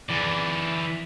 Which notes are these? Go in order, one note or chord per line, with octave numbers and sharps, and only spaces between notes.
E3 D5